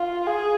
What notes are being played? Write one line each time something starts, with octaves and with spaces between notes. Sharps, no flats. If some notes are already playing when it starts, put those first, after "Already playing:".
Already playing: F4
G#4